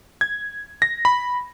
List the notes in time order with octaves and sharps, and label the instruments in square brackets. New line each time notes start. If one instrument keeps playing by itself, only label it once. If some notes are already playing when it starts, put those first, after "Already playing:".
[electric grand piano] G#6
A#6
B5